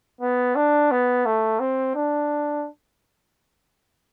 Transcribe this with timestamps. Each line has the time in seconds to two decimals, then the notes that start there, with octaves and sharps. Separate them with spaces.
0.21 B3
0.56 D4
0.91 B3
1.26 A3
1.60 C4
1.95 D4